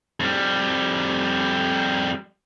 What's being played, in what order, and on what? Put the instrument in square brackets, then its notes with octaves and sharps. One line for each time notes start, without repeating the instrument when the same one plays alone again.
[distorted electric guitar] F2 G3